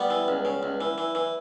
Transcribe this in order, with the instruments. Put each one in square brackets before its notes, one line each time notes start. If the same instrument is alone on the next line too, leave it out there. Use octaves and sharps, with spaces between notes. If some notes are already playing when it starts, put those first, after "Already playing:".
Already playing: [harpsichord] G3 B3
E3
C#2
C#3
C#2
E3
E3
E3